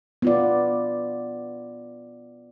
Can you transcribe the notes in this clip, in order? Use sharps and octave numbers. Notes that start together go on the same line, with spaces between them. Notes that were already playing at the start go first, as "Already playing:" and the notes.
B3 F4 D5